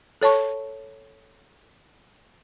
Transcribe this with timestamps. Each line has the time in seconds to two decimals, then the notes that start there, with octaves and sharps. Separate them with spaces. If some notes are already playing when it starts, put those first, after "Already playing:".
0.22 A4 C#5 A5 C#6